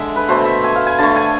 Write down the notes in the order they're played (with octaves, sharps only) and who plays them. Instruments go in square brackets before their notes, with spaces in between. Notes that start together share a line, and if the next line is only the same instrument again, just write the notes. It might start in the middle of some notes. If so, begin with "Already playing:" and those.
Already playing: [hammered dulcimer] D3 G#3 E5
B4
B2 A3 C5
E5
G#5
F5
G#5
D3 A3 A5
G#5